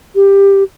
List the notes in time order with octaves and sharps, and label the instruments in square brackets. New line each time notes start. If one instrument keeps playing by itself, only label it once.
[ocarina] G4